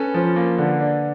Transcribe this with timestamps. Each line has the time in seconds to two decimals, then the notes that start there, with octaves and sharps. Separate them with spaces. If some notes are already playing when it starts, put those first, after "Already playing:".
Already playing: C#4 A4 B4
0.14 F3
0.36 A#3
0.58 D3
0.81 D4